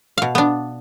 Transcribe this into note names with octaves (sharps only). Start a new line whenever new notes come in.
B2 F5
B3 D4